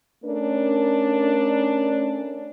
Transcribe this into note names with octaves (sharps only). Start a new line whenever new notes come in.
A3 C#4 D4 A#4